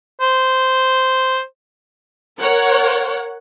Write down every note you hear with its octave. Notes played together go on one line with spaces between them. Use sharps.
C5
A#4 C#5 F#5